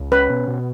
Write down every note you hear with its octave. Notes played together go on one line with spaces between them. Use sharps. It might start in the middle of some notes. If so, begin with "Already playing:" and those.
Already playing: C#2
C#4 B4
B2
B2